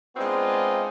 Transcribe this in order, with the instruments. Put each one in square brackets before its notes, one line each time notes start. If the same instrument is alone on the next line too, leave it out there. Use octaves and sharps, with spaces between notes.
[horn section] G#3 B3 C4 D4 D#4 F4